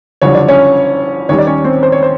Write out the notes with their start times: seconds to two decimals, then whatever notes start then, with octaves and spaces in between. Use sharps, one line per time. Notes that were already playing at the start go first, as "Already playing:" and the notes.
0.22 F#1 F2 D3 G3 C#5
0.35 D5
0.48 C#4 C#5
1.29 D#2 D#3 G3 C#4 C#5
1.38 D5
1.47 C#4 C#5
1.64 C4 C5
1.83 C5
1.92 C#5
2.03 C5